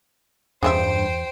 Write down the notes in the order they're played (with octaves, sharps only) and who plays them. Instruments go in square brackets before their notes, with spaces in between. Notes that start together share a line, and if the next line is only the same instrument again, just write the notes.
[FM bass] E2 [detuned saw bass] G2 [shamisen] C#3 F3 E5 [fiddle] C5 G5